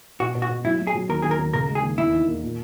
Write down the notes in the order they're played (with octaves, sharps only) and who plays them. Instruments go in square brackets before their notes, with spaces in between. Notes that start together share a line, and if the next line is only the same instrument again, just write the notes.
[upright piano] B2 [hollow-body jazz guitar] F#4
[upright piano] B2
[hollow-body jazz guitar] F#4
[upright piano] B2
[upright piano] F#3 [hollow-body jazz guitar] E4
[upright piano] F#3
[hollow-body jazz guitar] G#4
[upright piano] F#3
[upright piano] D#2 [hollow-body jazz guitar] A#4
[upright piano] D#2 [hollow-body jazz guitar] G#4
[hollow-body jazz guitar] A#4
[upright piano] D#2
[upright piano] C#3 [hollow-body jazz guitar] A#4
[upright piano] G#3
[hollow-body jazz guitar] G#4
[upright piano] D#2
[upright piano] E1 [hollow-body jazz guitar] E4
[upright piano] D#3
A#3
A#2